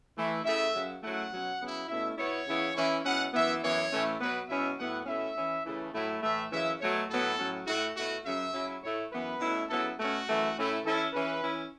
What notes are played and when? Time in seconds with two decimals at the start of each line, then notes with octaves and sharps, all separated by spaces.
0.16 E3 A3 E4
0.43 C#3 A3 E4 E5
0.73 F#2 C#3 F#3
1.02 C#3 F#3 A3 E4 F#5
1.31 B2 F#3 C#4
1.60 C#3 F#3 B3 E4
1.88 B2 A3 C#4 E4 E5
2.17 B2 B3 E4 C#5
2.46 C#3 E3 B3 E4
2.75 E3 C#4 E4
3.04 B2 F#3 C#4 E4 F#5
3.32 F#2 E3 B3 E4 E5
3.61 F#2 E3 B3 C#5
3.91 A2 E3 A3 C#4 E4
4.19 B2 F#3 B3 B4
4.48 B2 F#3 C#4 E4 E5
4.77 A2 F#3 B3 E4 F#5
5.06 B2 A3 C#4 E4 E5
5.35 E3 C#4 E4
5.64 C#3 E3 A3
5.92 A2 F#3 A3 E4
6.22 A2 E3 A3 E5
6.51 F#2 C#3 E3 C#4 E5
6.79 B2 F#3 A3 C#5
7.08 A2 F#3 B3 E4 A4
7.37 A2 F#3 C#4
7.66 A2 A3 E4 F#4
7.95 B2 A3 E4 F#4
8.24 F#2 C#3 F#3 E5
8.52 C#3 F#3 C#4 E4
8.82 A2 A3 E4 C#5
9.11 F#2 E3 B3 B4
9.40 B2 A3 C#4 E4
9.68 C#3 F#3 B3 E4 A4
9.97 B2 A3 C#4 F#4
10.26 F#2 E3 A3 E4
10.55 A2 A3 C#4 E4
10.83 E3 C#4 E4 A4
11.12 C#3 E3 C#4 B4
11.42 E3 C#4 E4